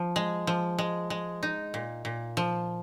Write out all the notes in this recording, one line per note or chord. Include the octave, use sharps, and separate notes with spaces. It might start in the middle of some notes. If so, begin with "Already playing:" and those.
Already playing: F3
G#3
F3
G#3
G#3
D#4
A#2
A#2
F3